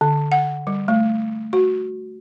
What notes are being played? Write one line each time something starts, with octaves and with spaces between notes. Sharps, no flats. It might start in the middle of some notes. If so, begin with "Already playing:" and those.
D3
F#5
G3
A3
F#4